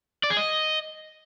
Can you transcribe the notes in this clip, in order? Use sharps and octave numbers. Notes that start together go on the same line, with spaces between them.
D5
G#4
D#5